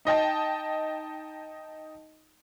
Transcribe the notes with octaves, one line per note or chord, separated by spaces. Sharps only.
D#4 D#5 G5 A5